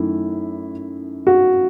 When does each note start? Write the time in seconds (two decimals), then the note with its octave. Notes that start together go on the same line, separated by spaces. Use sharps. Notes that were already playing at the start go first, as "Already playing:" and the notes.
Already playing: F#2 D#3 A3 E4
1.27 F#4